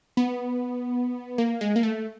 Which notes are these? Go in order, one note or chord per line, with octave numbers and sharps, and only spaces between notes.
B3
A#3
G#3
A#3
A3